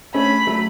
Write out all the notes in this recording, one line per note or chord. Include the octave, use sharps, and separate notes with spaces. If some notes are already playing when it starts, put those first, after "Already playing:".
A3 C#4 B5
F#3 A3